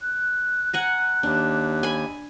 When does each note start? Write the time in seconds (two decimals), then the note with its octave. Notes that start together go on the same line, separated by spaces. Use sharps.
0.02 F#6
0.73 F#5 G#5 A#5
1.23 D#2 D4
1.83 G#5 B5